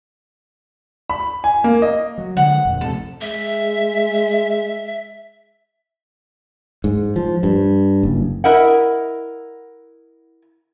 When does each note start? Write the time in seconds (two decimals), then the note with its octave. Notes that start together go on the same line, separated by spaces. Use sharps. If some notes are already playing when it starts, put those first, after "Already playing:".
1.10 B5
1.44 G#5
1.64 A#3
1.82 D#5
2.18 F#3
2.37 D3 G#3 F#5
2.65 A#1 F2
2.81 F2 A2 C3 A4
3.21 G#3 E5
6.84 G#2
7.16 F3
7.43 G2
8.03 F#1
8.44 E4 A#4 D#5 E5 F#5